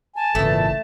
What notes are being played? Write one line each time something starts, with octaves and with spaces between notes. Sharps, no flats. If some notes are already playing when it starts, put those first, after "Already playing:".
G#5 A5
G#1 A#2 C#3 E3 A3 A4